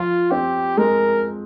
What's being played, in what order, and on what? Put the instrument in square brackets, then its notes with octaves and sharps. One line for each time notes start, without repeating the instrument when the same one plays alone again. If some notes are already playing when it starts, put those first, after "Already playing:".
Already playing: [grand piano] F3 [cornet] F4
[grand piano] C4 [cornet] G4
[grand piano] G#3 [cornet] A#4